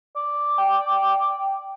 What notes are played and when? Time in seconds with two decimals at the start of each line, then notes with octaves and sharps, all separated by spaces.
0.16 D5
0.58 G5